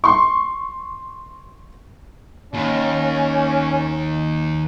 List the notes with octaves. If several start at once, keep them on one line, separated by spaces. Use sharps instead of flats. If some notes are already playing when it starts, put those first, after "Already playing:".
C6 C#6
D#2 C#4